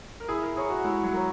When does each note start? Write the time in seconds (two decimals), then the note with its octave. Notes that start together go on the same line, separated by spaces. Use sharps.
0.20 A#4
0.29 E4 G#4
0.42 A#4
0.56 G#4 A#4 C#5
0.70 F#4
0.84 G#3 E4
1.03 F#3
1.13 A#4 C#5